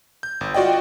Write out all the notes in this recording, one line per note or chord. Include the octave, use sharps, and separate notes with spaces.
G6
G1
F4 F#4 D5 D#5 G5